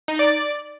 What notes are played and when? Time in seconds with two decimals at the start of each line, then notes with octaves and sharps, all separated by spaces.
0.08 D#4
0.19 D5
0.30 D5